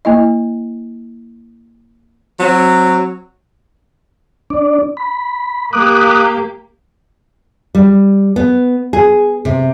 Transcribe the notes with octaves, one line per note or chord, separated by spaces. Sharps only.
A#3 E4 D#5
F#3 C4
D4 D5
B5
A#3 G4 D6 D#6 F#6
G3
B3
G#4
C3